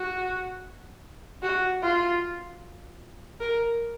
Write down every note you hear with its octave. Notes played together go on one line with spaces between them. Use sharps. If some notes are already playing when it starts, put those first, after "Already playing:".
Already playing: F#4
F#4
F4
A#4